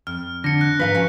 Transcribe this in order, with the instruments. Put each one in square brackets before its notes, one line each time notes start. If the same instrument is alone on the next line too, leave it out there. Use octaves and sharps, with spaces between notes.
[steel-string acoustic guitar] F2 [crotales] F6
[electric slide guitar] D3 [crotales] A#6 C#7
[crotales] F#6
[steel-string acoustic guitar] G#2 F5 A#5 [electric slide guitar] B4
[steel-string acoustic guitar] F3 C#4 F#4